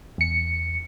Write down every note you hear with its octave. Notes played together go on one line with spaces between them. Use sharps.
E2 C#7